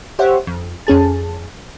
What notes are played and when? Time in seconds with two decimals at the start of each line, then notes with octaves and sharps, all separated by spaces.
0.19 G4 C5 C#5 E5 F#5
0.47 F2
0.87 F2 C#4 G#4 A5